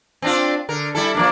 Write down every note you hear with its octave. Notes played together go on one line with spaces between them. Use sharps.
C4 D4 F4
D3 A#4
G3 E4 A4
F3 A#3 D4